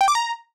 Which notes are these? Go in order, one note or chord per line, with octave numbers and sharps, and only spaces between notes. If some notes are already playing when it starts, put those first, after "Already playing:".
G5
D6
A#5